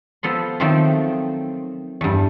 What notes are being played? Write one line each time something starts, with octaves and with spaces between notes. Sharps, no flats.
F3 B3 A4 C6
D#3 F3 F#3 A3 C4
E2 G2